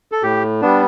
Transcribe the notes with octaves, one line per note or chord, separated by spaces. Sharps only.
A4
A2 G4
G3 B3 D4